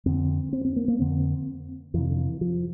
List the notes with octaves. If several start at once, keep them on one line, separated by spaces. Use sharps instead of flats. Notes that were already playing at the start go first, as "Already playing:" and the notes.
F2 D3 C4
C4
C4
A#3
A#3
F2 D3 C4
F2 C3 E3
D3
E3
F3